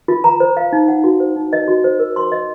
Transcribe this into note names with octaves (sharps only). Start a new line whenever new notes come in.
F4
A#5
C5
F5
D#4
F#5
F#4
C5
D#4
D#5
F#4
C5
A#4
C6
D#5